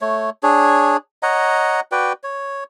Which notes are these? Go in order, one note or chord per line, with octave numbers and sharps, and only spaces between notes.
A3 C#5
D4 G#4 C#5
C#5 D#5 F#5 A#5
F#4 B4 D5 G5
C#5